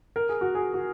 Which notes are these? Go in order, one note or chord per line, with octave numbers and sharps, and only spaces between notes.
A#4
G#4
F#4
G#4
F#4